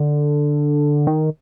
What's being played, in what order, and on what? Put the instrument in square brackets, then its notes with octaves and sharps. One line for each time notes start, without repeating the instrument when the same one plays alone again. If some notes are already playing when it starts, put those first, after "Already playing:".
Already playing: [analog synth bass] D3
D#3